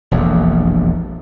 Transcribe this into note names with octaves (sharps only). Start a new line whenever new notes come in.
E1 A#1 F2